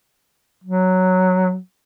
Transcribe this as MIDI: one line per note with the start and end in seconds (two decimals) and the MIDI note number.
0.64 1.57 54